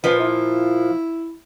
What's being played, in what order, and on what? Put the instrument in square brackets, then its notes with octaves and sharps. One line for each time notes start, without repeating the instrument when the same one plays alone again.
[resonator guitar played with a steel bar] A#2 F3 [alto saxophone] B4
[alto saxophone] E4